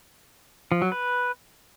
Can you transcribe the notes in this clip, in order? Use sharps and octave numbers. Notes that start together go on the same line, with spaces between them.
F3
F#3
B4